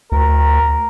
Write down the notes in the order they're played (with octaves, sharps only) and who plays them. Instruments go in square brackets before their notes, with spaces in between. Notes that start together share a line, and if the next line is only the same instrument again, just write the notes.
[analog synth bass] D2 [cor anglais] A#4